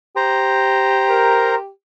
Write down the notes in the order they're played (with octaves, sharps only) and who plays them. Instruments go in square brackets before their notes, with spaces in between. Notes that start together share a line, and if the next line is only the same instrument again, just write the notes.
[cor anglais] G4 [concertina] C5 A#5
[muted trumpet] A#4